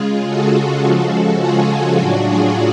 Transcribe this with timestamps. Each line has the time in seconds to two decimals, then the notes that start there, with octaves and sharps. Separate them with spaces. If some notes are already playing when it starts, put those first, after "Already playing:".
Already playing: C#3 G#3 F4 G#4
0.27 F#4 A4
0.83 C#3 F3 G#3
1.39 F4 G#4
1.96 A2 F#3 D4 F#4
2.24 F4 G#4